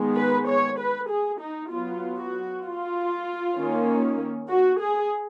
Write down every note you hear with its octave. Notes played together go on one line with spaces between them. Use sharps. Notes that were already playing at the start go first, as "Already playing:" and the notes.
Already playing: D#3 G#3 B3
B4
C#5
B4
G#4
D#4
F#3 B3 F4
F#4
F4
D#3 A#3 C#4
F#4
G#4